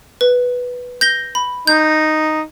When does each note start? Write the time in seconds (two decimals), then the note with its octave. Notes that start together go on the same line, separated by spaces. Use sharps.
0.21 B4
1.01 G6 A#6 G7
1.35 B5
1.67 D#4 G6